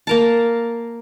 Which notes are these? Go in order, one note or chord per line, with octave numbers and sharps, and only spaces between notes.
A#3 A#4 A5